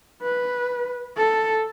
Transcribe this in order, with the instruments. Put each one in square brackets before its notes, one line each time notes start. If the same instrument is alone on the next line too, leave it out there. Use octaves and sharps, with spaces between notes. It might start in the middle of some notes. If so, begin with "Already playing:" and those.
[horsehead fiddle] B4
A4